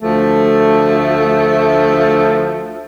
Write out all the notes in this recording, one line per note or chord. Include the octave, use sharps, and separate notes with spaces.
D2 F3 A3